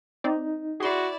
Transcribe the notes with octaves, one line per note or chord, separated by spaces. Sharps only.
C4 D#4 D5
E4 F#4 G#4 D5 C6